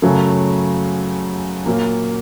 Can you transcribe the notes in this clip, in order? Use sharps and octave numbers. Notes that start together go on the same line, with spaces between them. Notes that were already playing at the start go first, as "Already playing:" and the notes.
F#2 C#3 F#3 A3
A#2 F#3 A#3